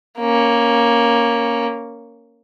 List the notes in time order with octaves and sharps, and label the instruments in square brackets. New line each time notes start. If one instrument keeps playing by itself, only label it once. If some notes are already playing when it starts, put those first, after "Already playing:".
[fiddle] A#3 C#4